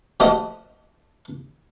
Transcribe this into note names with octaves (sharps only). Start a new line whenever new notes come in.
F3 A3 F4 F#4 C5 D#5